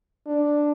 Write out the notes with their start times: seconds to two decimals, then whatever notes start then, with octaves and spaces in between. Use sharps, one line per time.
0.27 D4